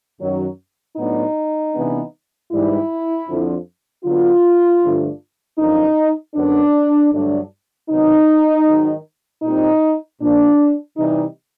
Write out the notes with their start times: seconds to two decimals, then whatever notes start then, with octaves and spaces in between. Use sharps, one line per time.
0.19 F#2 D#3 F#3
0.97 A2 F#3 B3 D4 D#4
1.73 C3 E3 G#3 B3 D4
2.51 G#2 E3 G3 E4
3.28 F2 D3 F3
4.04 D3 F#3 B3 D4 F4
4.81 G2 D3 F3 A3 D4
5.58 F#2 D3 F3 A#3 D4 D#4
6.35 F#2 D3 F#3 B3 D4
7.12 G2 D3 F#3 A3 D4
7.89 C3 D#3 F#3 B3 D#4
8.66 G#2 D#3 F#3
9.43 A#2 G3 C4 D#4
10.20 A#2 F3 A#3 D4
10.97 C3 E3 G3 D#4